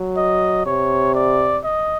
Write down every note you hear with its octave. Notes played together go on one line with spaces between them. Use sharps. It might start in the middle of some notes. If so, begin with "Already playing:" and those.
Already playing: F#3
D#5
C3 C#5
D5
D#5